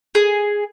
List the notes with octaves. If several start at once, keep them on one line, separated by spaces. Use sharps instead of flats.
G#4